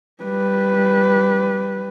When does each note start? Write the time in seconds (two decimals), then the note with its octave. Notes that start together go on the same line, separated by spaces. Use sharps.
0.23 G3 B4